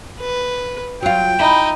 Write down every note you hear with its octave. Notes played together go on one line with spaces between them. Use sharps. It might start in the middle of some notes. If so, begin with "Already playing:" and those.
B4
F#3 F4 G5
D#4 E4